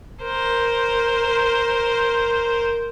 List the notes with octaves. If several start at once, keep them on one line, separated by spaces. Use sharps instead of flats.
A#4 C5